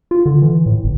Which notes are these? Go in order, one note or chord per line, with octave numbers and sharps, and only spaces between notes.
F4
D3
E3
A2
G1